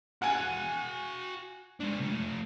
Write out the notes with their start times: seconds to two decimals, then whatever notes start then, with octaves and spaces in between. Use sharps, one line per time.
0.22 F#4 F5 F#5 G#5
1.80 G#3 D4
1.99 C3 A3